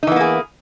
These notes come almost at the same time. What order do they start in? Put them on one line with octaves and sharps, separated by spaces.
D#4 E3 B3 A#3 G#4